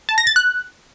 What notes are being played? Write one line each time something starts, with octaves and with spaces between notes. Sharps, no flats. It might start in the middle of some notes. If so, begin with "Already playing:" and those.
A5
A#6
A6
F#6